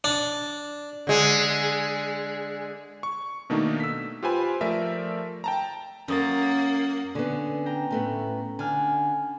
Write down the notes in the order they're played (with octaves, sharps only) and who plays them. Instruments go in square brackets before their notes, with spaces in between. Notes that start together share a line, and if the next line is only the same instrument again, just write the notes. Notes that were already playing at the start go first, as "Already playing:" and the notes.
[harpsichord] D4
[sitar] D3 G#3
[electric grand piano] C#6
B2 D#3 A3 A#3 D4 D#4
E6 B6
F4 G4 B4 C5 G#5 B5
F3 A3 A#4 D5 E5
G5 A5 A#5
[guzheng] F#2 [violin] A#3 F#5 [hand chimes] C#4 D#6 A6
[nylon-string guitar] D3 B3 [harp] C#4
[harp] G5 A#5
[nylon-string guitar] A2 A3 B3
[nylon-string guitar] D3 [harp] G#5 F6